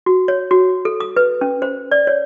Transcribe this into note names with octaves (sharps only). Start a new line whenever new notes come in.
F#4
C#5
F#4
A4
D#6
B4
C#4
C5
D5
C#5